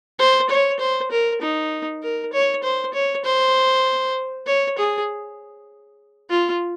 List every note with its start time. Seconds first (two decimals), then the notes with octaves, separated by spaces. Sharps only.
0.19 C5
0.49 C#5
0.79 C5
1.11 A#4
1.41 D#4
2.02 A#4
2.33 C#5
2.63 C5
2.94 C#5
3.25 C5
4.46 C#5
4.78 G#4
6.30 F4